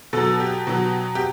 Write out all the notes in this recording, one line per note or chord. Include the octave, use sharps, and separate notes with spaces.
B2 F#3 A4
G4
B2 F#3
G4